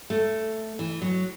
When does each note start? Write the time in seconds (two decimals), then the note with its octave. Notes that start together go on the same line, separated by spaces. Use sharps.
0.10 A3
0.79 E3
1.02 F#3